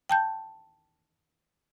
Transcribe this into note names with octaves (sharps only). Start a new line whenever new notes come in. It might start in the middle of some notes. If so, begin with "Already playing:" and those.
G5 A5 G6